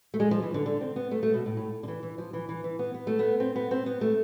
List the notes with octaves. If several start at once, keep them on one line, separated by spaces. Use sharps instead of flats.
A3
G#3
F3
E3
D3
D3
C4
B3
A3
A3
B2
A2
A2
D3
E3
E3
F3
E3
E3
E3
B3
B3
A3
B3
C4
B3
C4
B3
A3